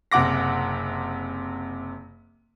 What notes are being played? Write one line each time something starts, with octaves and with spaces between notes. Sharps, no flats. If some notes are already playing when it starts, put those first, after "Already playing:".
F#1 C3 F#5 D6 A#6